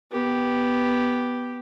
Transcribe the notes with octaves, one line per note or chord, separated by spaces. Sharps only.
B3 G4